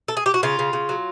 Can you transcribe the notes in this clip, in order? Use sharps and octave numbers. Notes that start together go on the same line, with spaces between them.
A4
G#4
G4
F#4
C#3 F4
C#3
C#3
F#3